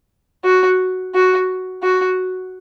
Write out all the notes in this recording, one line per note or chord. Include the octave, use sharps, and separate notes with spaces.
F#4
F#4
F#4